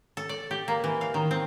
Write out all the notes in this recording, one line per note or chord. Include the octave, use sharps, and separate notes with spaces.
A4
D5
G4
A#3
E3
F5
D#3
C4